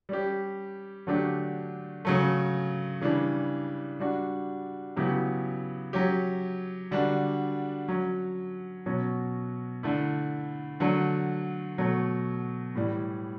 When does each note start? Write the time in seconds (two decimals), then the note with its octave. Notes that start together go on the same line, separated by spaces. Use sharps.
0.09 G3 C#4 G4
1.07 D3 F#3 A3 D4 G4
2.05 C#3 F#3 A3
3.02 C#3 E3 G3 D4
4.00 G3 D4 F#4
4.96 C#3 F#3 B3 E4 G4
5.93 F#3 C#4 G4
6.91 D3 G3 D4 F#4
7.88 F#3 C#4 F#4
8.86 B2 F#3 C#4
9.83 D3 A3 E4
10.80 D3 F#3 A3
11.78 B2 F#3 A3
12.75 A2 E3 G3